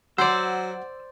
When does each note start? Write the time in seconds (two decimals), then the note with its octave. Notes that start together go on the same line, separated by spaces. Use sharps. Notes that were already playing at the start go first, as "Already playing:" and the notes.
0.18 F#3 C5 D5 F#5 E6